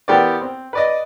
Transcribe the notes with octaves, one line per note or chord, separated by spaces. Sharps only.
E3 B3 G4 A#4 C5 D5
C4
B4 D5 D#5